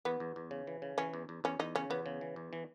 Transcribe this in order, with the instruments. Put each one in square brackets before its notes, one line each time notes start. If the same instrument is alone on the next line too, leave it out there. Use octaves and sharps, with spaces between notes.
[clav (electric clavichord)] E2 [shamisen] B3
[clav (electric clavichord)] E2
E2
C#3
E3
C#3
[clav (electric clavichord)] E3 [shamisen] C#4
[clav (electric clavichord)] E2
E2
[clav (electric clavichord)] E2 [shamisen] C#4
[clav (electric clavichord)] E2 [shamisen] D#4
[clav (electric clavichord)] C#3 [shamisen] C#4
[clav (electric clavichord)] E2 [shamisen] B3
[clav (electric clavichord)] C#3
E3
E2
E3